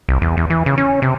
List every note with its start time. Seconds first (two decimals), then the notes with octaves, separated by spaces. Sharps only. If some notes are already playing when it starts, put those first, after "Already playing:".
0.09 C2
0.22 E2
0.37 E2
0.50 E3
0.66 C#3
0.78 C#4
1.02 C3